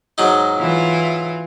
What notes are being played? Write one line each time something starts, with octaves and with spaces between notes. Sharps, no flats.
G#2 F#3 D#4
E3 E4 F4